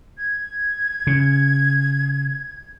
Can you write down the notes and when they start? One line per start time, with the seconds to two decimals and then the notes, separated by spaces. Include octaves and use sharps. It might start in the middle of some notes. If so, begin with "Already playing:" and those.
0.17 G#6
1.07 C#3